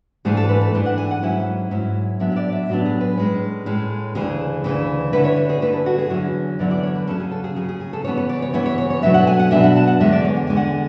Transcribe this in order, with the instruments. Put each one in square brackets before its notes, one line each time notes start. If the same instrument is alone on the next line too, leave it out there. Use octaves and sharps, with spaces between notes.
[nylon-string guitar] G#2 E3 A3 D4 G#4
A4
B4
A4
G#2 E3 A3 D4 G#4
F#5
G#5
F#5
G#2 F#3 C#4 E4
G#2 F#3 C#4 E4
A2 F#3 B3 D4 E5
E5
D5
E5
A2 F#3 B3 D4 F#4
G#4
B4
A2 G#3 C#4
A2 G#3 C#4
D2 C#3 E3 G#4
D2 C#3 E3
D3 A3 E4 B4
C#5
C#5
G#4
D3 A3 E4 B4
A4
F#4
G#4
E2 D3 F#3 C#4 E4
E2 D3 F#3 C#4 E4 D5
D5
C#5
B4
C#3 F#3 C#4 A4
G#4
A4
G#4
C#3 F#3 C#4 G#4
G#4
G#4
A4
C#3 E3 B3 E4 C#5
C#5
D5
C#5
C#3 E3 B3 E4 C#5
C#5
C#5
C#5
B2 F#3 A3 D4 E5
F#5
G#5
F#5
B2 F#3 A3 D4 E5
F#5
A5
F#5
E2 D3 G#3 E5
D5
C#5
F#5
E2 D3 G#3 G#5
F#5
G#5